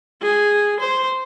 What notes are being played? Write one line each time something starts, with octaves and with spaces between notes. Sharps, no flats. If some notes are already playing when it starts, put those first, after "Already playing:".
G#4
C5